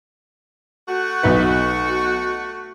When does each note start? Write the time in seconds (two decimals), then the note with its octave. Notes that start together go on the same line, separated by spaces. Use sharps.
0.88 A3 F#4
1.23 B1 D#4 B4